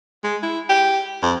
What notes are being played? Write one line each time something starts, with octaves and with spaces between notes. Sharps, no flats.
G#3
E4
G4
F2